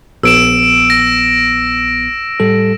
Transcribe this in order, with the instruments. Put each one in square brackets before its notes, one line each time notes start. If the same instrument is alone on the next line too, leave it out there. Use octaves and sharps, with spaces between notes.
[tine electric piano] A#1 B3 [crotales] E6 D7 E7
[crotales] A#6
[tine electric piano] A2 G3 A4